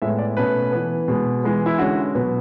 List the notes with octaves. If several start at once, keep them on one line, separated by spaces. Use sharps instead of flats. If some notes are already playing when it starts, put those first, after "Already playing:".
A2 G#3 B3 E5
D5
B2 A3 C#4 B4
E3 B3
B2 G#3 B3
E3 G#3 B3
E4
D3 G#3 C#4 F#4
B2 F#3 B3